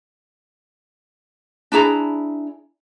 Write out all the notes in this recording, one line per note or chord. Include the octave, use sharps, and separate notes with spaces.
D4 E4 G#4 A#5